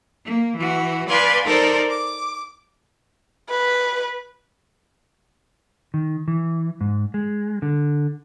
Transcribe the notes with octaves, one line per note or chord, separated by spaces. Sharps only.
A#3
E3 F#4
B4 D5 F5 G#5 C6
D#4 A4 A#4 C5 D5
D6
B4
D#3
E3
G#2
G#3
D3